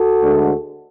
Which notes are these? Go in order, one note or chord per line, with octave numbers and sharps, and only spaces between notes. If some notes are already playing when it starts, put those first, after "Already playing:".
Already playing: F#4 A4
D2 D3 G#3